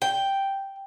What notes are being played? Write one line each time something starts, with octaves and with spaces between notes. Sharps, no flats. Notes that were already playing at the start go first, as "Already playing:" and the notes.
G5